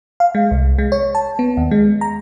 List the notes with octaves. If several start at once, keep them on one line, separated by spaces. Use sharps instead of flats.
F5
G#3
C2
G#3
C#5
A5
B3
D#2
G#3
A#5